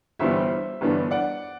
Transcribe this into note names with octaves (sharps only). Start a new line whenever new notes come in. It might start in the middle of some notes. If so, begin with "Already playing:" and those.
G1 G2 E3 G3 B3 C5 E5
G1 G2 E3 B3 D4
D5 F#5